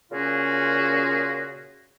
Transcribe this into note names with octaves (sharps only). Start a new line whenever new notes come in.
A#2 C#3 C#4 F4 F#4 G#4